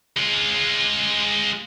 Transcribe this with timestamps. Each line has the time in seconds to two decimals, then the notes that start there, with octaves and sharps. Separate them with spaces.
0.17 G#3 F4